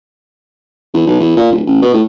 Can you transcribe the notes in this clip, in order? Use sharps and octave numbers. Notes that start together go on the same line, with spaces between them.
E2
B1
E2
A#2
D1
A1
B2
A2